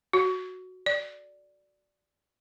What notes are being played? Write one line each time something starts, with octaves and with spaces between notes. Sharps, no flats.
F#4
D5